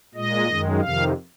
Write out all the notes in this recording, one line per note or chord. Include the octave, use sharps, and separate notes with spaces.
A#2 G#3 D#5
F#2 D#3 G#3
F2 C3 D#3 F5